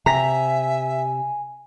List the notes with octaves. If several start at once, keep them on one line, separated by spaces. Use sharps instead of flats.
C3 E5 G#5 A#5 B6